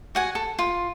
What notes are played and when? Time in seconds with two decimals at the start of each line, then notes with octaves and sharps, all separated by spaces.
0.15 F#4 F#5 G#5
0.35 A4
0.59 F4